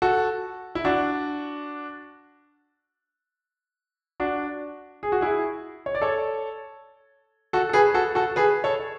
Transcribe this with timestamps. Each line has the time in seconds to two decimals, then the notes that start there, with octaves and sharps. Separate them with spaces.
0.02 F#4 A4
0.75 E4
0.85 D4 F#4
4.20 D4 F#4
5.03 G#4
5.12 F#4
5.21 E4 G#4
5.86 C#5
5.95 D5
6.01 A4 C#5
7.53 F#4 A4
7.69 A4
7.73 G#4 B4
7.94 F#4 A4
8.15 F#4 A4
8.36 G#4 B4
8.64 A4 C#5